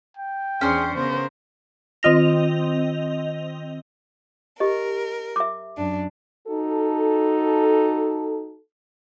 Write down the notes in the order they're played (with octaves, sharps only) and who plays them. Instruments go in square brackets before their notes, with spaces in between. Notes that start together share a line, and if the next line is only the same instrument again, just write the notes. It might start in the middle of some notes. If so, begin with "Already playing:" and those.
[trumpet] G5
[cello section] E2 D4 C5 [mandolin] C#4 C6 [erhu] G#4
[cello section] C#3 B3 A#4 [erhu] C5
[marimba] D#3 F4 A#6 [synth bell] C4 D#5 F7
[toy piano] G4 D#5 [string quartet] A#4
[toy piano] E5 D6
[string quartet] F#2 D4
[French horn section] D#4 F#4 A4